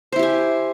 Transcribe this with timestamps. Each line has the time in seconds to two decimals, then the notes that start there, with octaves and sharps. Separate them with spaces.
0.12 C5
0.16 E4
0.19 G4
0.23 G#5